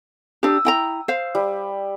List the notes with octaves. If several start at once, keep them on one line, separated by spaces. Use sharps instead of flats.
D4 G4 D#6 E6
E4 G5 A#5
C5 F5
G3